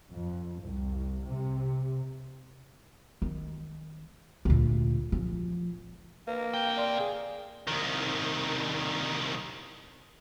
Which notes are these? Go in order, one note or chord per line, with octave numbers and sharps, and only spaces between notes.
F2
C2
C3
D#3
D2 A#2
F3
A#3 B4
C3 G5
D5 C6
G#4
C2 D#3